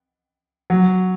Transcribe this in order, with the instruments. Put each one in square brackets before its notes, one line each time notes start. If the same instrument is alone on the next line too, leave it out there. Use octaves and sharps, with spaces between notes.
[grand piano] F#3